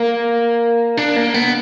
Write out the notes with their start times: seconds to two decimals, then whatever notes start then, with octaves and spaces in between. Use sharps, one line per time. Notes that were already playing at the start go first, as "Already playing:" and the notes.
Already playing: A#3
0.97 D4
1.16 A#3
1.34 B3